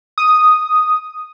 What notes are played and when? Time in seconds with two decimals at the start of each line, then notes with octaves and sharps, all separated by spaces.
0.18 D#6